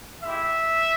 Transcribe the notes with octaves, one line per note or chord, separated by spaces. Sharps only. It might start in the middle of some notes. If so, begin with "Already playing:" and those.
G#3 E4 G4 E5